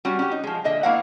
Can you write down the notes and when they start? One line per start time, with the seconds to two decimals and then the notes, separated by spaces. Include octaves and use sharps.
0.05 G3 C#4 F#4
0.19 C#4 G4
0.32 D#4
0.44 F3 G#3
0.64 A#2 D3 D#5 E5
0.83 A#3 B3 E4 C#5 F5 F#5